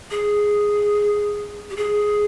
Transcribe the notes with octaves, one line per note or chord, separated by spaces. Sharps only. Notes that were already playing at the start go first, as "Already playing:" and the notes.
G#4
G4
G#4